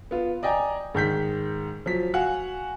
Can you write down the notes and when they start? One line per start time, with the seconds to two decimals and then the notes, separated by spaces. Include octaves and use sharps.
0.11 B3 F4
0.43 D5 D#5 G5 G#5 A#5
0.95 G#2 D#3 G6 B6
1.86 F3 F#3 B6
2.14 F#4 F5 F#5 G#5